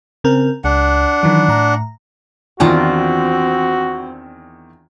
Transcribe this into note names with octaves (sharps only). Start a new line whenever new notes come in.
C#3 C4 A#4
C#2 D4 F#5
D#3 E3 F#3
A2 A#5
E2 D#3 E3 C4 D4 F4 F#4 A#5